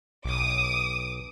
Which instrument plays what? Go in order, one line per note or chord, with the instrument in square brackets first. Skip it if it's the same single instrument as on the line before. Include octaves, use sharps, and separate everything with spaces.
[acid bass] B1 [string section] D6 D#6